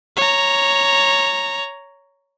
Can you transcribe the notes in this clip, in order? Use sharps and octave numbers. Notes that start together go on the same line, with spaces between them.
C#5 A#5